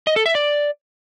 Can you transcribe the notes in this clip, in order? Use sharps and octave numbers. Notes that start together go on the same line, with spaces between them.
D#5
A4
E5
D5